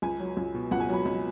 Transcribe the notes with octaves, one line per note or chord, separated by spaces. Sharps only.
C#2 G#5
F#3
C#2
B2
C#2 F#5
G#5
F#3 B5
C#2